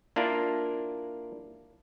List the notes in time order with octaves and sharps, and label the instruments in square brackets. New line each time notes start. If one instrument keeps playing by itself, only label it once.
[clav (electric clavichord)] A#3 D4 E4 F4 A#4